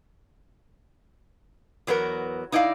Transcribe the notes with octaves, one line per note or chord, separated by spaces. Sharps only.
E2 F#3 B3 D#4 A#4
D#4 E4 D5 D#5 F5